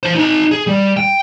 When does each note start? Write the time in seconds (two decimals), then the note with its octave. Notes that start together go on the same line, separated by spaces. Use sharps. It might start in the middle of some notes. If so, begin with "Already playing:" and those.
0.03 C5 A5
0.15 D#4 A5
0.51 G#4
0.67 G3
0.97 G5